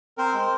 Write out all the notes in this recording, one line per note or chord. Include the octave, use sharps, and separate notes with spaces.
C4 A#4 C5
G#3